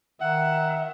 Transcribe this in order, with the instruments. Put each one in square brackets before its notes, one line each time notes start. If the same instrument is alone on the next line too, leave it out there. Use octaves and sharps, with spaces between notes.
[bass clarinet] D#3 [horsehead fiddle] E5 [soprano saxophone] F#5